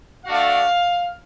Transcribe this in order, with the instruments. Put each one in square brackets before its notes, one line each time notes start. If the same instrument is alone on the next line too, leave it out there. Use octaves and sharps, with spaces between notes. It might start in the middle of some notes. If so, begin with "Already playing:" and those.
[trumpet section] A3 D4 F#4 F5